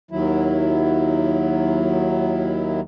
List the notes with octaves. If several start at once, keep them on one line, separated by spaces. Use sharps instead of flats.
D#2 D#3 F#3 E4